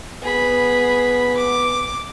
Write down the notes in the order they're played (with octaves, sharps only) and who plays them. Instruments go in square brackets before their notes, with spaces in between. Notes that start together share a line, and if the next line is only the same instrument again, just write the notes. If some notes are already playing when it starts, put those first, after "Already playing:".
[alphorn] B3 [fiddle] G#4 B5
[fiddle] D6